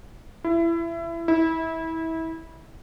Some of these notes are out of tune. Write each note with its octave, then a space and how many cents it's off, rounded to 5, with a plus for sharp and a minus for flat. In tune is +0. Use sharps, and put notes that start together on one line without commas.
E4 +25
E4 -25